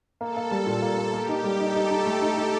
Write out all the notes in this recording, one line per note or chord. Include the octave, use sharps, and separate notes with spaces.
A#3 A4
A#3
G3
A#2
A#3
A#3
A#3 G4
D#4
G3
D#4 A4
D#4
D#4
A3
D#4
D#4